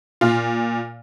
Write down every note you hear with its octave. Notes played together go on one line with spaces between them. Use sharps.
A#2 F4